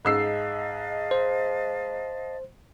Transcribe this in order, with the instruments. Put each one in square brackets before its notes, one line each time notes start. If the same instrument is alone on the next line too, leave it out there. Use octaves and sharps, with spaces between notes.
[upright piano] G#2 E6 C7 [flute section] D#5 F5 A5
[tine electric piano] C5